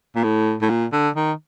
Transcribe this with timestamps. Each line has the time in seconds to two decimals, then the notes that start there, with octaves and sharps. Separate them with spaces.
0.16 A#2
0.23 A2
0.62 A2
0.70 A#2
0.92 D3
1.16 D#3